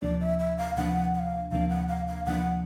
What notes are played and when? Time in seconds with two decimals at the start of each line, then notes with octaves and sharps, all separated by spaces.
0.02 D2 C3 F3 A#3 D4 D5
0.21 E5
0.40 E5
0.58 F5
0.77 D2 C3 F3 A#3 D4 F#5
1.14 F#5
1.19 F5
1.51 D2 C3 F3 A#3 D4 F5
1.70 F#5
1.89 F5
2.08 F5
2.26 D2 C3 F3 A#3 D4 F#5